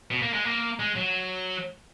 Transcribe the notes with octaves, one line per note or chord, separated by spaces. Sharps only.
B2
A#3
G#3
A#3
G#3
F#3